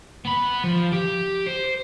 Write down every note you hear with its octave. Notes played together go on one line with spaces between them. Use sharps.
B3 B5
F3
G4
C5